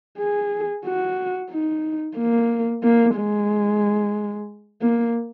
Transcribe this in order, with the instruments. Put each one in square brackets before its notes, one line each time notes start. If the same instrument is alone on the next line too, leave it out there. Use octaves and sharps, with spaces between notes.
[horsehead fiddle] G#4
F#4
D#4
A#3
A#3
G#3
A#3